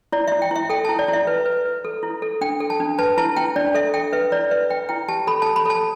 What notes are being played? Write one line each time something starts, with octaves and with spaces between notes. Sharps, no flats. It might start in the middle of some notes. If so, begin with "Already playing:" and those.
E4 D5
E5
E4
G5
E4 E5
A4 G5
A5
E4
D5
E4 E5
B4
B4
B4
A4
E4
A4
D4 G5
A4
A5
D4
B4 A5
E4 A5
E4 G5
D4 D5
A4 E5
A4 G5
B4 E5
E4 D5
B4 E5
B4 G5
E4 G5
G4 A5
A4 B5
A5
A4
B5
A4 A5